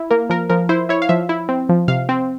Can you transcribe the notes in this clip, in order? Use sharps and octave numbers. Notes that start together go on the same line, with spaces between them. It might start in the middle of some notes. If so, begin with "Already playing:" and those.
Already playing: E4
A#3 A#4
F3 A#4
F3 A#4
E4 C5
E4 C#5
F5
F3 E5
E4
C4
F3
C3 F5
C4